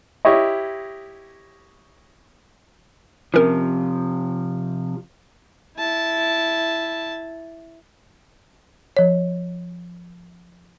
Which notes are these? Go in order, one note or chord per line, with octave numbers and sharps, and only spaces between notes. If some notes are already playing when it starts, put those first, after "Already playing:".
E4 G4 C#5 D#5
C3 F3 C#4 A#4
E4 A5
F3 C#5